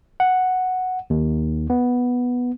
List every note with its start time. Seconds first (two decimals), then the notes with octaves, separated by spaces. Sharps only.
0.20 F#5
1.10 D#2
1.70 B3